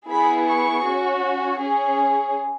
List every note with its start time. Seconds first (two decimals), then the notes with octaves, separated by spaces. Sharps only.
0.09 B3 E4 G#4 B5
0.47 C#6
0.85 C#4 F#4
1.60 C#4 G#4